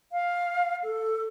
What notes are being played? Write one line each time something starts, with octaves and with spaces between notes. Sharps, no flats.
F5
A4